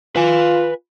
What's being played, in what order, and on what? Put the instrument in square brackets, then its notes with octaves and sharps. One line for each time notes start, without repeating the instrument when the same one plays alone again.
[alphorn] F4 [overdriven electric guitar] B4 G#5